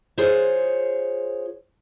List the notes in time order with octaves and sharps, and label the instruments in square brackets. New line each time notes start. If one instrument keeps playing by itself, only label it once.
[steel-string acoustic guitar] F4 G#4 C5 C#5